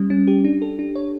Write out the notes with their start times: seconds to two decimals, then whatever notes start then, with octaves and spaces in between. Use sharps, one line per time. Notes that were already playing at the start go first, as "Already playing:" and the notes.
Already playing: G3 C#4
0.10 C#4
0.27 G4
0.44 D4
0.62 A4
0.79 D4
0.95 C#5